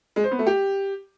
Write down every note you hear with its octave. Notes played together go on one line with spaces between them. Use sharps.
G#3
C5
B3
A3
G4